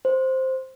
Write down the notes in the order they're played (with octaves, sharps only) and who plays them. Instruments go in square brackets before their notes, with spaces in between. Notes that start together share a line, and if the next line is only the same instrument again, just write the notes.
[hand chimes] C5